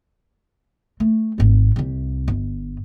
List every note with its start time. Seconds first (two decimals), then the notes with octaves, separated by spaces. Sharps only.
1.00 A3
1.38 G#1 C4
1.76 C2 C3
2.28 G1